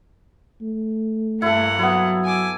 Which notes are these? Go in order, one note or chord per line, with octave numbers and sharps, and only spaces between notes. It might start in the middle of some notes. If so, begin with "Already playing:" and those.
A3
G2 A#3 E4 A4 F#5
F#3 B3 E4
G#5 D6